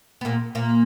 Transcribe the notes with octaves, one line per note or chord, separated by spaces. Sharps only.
B3
A#2 A#3
A#2 A#3